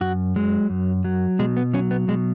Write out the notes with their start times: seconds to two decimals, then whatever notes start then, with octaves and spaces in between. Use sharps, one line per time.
0.01 F#2 F#4
0.36 F#3 G#3
0.70 F#2
1.04 F#3
1.39 B2 G#3
1.57 B3
1.73 F#3 C#4
1.91 B3
2.08 B2 G#3